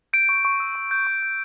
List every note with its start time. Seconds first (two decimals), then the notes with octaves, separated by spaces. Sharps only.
0.13 G6 D7
0.29 C#6
0.45 C#6
0.60 E6
0.75 C#6
0.91 G6
1.07 C#6
1.22 G6